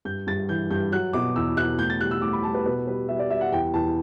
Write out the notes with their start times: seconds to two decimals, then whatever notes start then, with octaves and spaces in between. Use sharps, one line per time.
0.05 G2 G6
0.27 G2 A6
0.49 E3 G6
0.71 G2 G6
0.92 F#3 F#6
1.13 B2 D6
1.36 E2 E6
1.57 B2 F#6
1.79 A2 G6
1.90 A6
2.01 G3 F#6
2.11 E6
2.22 A2 D6
2.33 B5
2.43 G3 A5
2.54 B4
2.65 B2 B4
2.87 G3 B4
3.09 G3 E5
3.19 D5
3.30 G3 E5
3.41 F#5
3.52 E2 G5
3.74 E2 A5